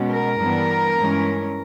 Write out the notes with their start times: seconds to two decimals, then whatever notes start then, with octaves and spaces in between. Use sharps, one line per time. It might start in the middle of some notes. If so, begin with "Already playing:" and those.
Already playing: B2 G#3 C#4
0.10 A#4
0.39 G2 E3 G3 B3 D4
0.98 G2 E3 G#3 C#4